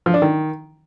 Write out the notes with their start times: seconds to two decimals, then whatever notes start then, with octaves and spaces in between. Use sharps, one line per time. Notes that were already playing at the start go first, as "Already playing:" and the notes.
0.06 F3
0.14 D4
0.22 D#3